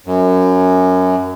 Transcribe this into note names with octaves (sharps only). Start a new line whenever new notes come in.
F#2